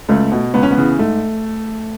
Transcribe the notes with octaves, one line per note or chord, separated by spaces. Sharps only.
C#2 A3
B2
C#2 B3
C#4
B3
C#3 E3
G#2 A3